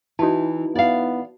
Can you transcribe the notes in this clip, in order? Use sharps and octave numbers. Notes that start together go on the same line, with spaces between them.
E3 D#4 E4 F#4 A5
B3 D5 F5